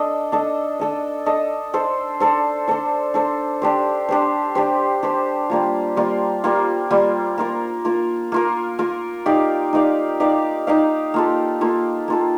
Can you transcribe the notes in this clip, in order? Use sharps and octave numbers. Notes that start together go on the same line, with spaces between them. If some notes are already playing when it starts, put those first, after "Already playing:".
Already playing: D4 A4 D#5
D4 A4 D#5
D4 A4 D#5
D4 A4 D#5
D4 A4 C5
D4 A4 C5
D4 A4 C5
D4 A4 C5
D4 G4 C5
D4 G4 C5
D4 G4 C5
D4 G4 C5
G3 A#3 F4
G3 A#3 F4
G3 A#3 F4
G3 A#3 F4
A#3 F4 A#4
A#3 F4 A#4
A#3 F4 A#4
A#3 F4 A#4
D#4 G4 D5 F5
D#4 G4 D5 F5
D#4 G4 D5 F5
D#4 G4 D5 F5
A#3 F4 A4
A#3 F4 A4
A#3 F4 A4